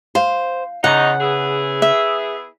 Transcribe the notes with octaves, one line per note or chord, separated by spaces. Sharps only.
C5 F5
E2 C#3 C#4 D#4 F#5
B3 E4 G#4
E5